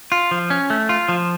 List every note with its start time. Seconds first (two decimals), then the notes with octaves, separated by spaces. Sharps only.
0.12 F4
0.31 F3
0.50 C#4
0.70 A3
0.89 F4
1.08 F3